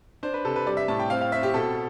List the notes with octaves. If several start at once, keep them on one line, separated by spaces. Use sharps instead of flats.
D4 C5
B4
C3 A4
B4
G3 D5
E5
A2 A5
G5
C4 F5
F5
C4 E5
G4
B2 A4